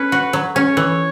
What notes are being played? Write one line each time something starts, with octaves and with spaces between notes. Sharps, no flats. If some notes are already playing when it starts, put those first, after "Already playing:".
Already playing: C#4 B4
F#4
F#3
C#4 C#5
E3